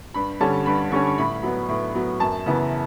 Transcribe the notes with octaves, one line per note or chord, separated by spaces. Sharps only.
G2 B5
D3 G3 C#4 A5
G2 B5
D3 G3 C#4 C#6
C#6
A2 B5
F#3 B3
A2
F#3 B3
F#2 A5
C#3 E3 B3 E4